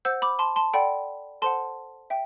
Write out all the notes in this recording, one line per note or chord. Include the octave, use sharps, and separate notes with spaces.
C5 F#5 E6 G6
B5 D6
A5 C6
A5 C6
A4 D5 F#5 G5 B5
A4 C5 F#5 A5 C6
E5 G5